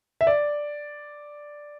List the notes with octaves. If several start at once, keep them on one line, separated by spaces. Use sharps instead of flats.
E5
D5